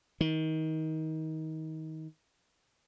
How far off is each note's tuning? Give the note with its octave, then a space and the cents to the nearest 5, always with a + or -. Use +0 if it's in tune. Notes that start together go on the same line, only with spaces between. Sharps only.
D#3 +25